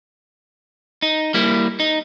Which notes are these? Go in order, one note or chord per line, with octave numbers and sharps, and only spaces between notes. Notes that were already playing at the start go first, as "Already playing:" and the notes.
D#4
G3 A#3 E4
D#4